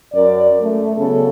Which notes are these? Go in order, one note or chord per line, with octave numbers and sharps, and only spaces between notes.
F#2 A#4 D5
A3
C#3 F#3 B3 A4